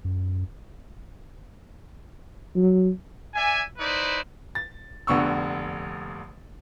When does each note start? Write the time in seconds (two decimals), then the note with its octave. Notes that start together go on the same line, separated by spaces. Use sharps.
0.04 F#2
2.56 F#3
3.34 D5 E5 G#5
3.78 D#4 E4 B4 C5 D5
4.55 A6
5.07 F1 A#1 D3 B3 C#6 E6